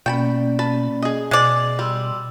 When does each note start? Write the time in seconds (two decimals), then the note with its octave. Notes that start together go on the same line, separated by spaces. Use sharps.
0.06 B2 A#3 C#4 D5 G5 A5 B5
0.59 B4 A5
1.02 G#4 D#5
1.31 B2 G#3 D5
1.79 G3 C6 E6